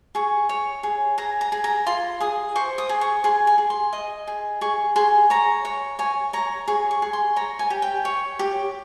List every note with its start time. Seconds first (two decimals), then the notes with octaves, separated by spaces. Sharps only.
0.15 G#4 C#6
0.49 C#5
0.83 G#4
1.18 G#4 A#5
1.41 A#5
1.52 G#4
1.64 A#5
1.86 F4 C6
2.20 G#4 D#6
2.56 C5 C#6
2.78 D#6
2.89 G#4
3.01 C#6
3.24 G#4 C6
3.47 G#5
3.58 G#4
3.70 C6
3.93 D#5
4.27 G#4
4.61 G#4 C#6
4.96 G#4 C6
5.30 C#5 A#5
5.65 C#5
5.99 C#5 G#5
6.33 C#5 A#5
6.68 G#4 C#6
6.91 C#6
7.02 G#4
7.13 C6
7.36 C#5 A#5
7.59 G#5
7.70 G4
7.82 G5
8.05 C#5
8.39 G4